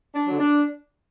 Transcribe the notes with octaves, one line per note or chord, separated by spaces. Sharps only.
D4
D3 F#3
D4